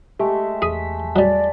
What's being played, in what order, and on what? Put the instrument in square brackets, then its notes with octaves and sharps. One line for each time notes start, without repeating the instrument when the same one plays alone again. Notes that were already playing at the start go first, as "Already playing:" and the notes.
[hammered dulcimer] G#3 A3 E5 [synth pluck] G4
[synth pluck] E2 B6 [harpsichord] G#4
[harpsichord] F#3 G3 [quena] D5